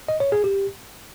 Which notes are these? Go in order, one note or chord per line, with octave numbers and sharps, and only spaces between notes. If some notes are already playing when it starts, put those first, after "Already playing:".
D#5
C#5
G#4
G4